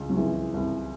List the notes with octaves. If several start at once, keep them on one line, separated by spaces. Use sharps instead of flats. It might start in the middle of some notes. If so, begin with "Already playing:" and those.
Already playing: C#2
F#3
C2 E3 G#3
C2